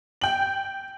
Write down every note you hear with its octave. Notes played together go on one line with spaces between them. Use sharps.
G5 F#7